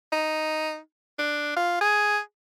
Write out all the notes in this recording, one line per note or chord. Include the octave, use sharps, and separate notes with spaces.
D#4
D4
F4
G#4